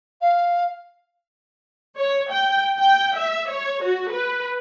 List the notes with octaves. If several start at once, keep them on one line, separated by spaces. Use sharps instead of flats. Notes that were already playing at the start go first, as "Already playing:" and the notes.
F5
C#5
G5
G5
E5
C#5
F#4
B4